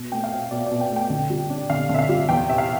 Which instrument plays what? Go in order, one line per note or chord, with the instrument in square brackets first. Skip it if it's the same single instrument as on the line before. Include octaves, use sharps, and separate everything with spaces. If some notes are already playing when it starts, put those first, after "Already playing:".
Already playing: [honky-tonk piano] B2
A3 G5
F5
C4 E5
B2 D5
D5
B2
G5
A3
G5
D3
G3
D4
D3 F5
D3
E5
F5
G3
E2 G5
C3 E5
F5